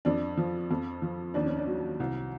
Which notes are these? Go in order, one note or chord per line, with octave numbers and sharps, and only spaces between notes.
F2 D4
F3
F2
F3
D#2 D4
C#4
D4
F#3
C2